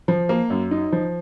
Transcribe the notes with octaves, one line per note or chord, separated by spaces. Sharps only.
F3
A#3
F#2
D#4
F3